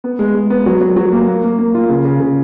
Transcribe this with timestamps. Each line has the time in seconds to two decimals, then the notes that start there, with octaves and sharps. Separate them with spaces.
0.04 B3
0.19 G#3
0.35 G#3
0.50 B3
0.66 F#3
0.81 F#3
0.96 F#3
1.12 A#3
1.28 A#3
1.44 A#3
1.58 A#3
1.74 F4
1.89 C#3
2.05 C#3
2.20 C#3